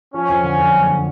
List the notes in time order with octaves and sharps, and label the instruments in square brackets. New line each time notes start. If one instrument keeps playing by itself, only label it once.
[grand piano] F3 [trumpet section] C#4
[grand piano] F2
D3
F2
F#1
D3